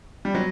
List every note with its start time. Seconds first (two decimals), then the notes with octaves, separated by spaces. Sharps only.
0.25 G3
0.35 F#3